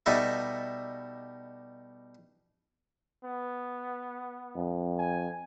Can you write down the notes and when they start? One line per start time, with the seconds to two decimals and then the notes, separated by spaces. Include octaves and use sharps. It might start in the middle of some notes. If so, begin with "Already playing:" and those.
0.06 B2 G3 D#4 A4 E5
3.25 B3
4.56 F2
4.99 G#5